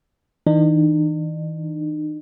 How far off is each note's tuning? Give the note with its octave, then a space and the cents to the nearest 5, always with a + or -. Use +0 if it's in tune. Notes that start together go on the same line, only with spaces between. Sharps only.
E3 -45 D#4 -45